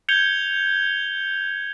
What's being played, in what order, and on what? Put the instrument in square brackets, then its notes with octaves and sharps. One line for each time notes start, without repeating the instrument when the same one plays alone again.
[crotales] G6 G#6 C#7 F7 G7